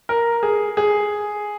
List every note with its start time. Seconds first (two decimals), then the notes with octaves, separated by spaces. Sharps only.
0.09 A#4
0.43 G#4
0.77 G#4